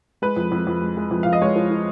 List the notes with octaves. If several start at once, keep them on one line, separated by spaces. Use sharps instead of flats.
G#3 B4
F2
F2
F2
G#3
G#3
F2
F2 F5
D#5
G#3 C#5
F3
F3